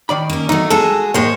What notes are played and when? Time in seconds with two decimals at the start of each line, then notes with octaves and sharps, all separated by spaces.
0.09 D#3 D5 B5
0.30 A#3 C#4
0.49 F#3 A3 D#4
0.70 G#3 F#4 G#4 A4
1.14 A2 G#3 A#3 C5 C#5